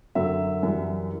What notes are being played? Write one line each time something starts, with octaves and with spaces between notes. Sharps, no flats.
F#2 D3 F#3 E5
F#2 E3 G3